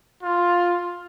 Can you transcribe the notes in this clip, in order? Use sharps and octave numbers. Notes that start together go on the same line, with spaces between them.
F4